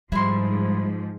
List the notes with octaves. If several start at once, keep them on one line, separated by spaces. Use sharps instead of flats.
G#2 F3 G3 E4 C6